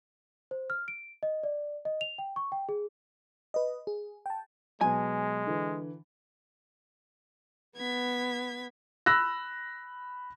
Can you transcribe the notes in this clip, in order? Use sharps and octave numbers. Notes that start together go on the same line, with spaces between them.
C5
F6
D7
D#5
D5
D#5
F7
G5
C#6
G5
G#4
B4 D#5
G#4
G5 A5
B2 F#3 G#3 G#5
D3 E3
B3 G#6 B6
B5 E6 F#6 A#6